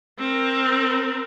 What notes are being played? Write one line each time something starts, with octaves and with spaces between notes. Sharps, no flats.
C4 A#4